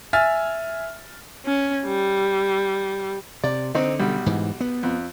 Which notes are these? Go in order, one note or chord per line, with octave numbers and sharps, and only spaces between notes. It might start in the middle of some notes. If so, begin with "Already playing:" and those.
E5 G#5 F6 A6
C#4
G3
C3 D5
D3 C4 D#4
B1 G3
G#2 E3
B3
F2